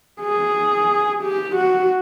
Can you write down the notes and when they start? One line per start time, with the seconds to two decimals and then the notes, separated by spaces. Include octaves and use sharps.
0.22 G#4
1.23 G4
1.56 F#4